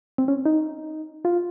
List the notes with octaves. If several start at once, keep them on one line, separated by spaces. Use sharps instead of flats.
C4
C#4
D#4
F4